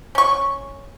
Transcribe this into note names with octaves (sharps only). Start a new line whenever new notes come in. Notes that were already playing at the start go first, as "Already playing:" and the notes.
C#4 C#6